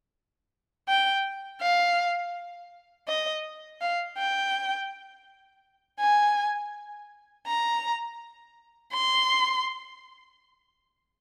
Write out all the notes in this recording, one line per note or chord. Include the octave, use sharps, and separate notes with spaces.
G5
F5
D#5
F5
G5
G#5
A#5
C6